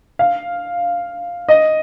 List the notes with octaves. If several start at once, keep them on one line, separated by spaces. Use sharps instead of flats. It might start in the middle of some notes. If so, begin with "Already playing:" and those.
F5
D#5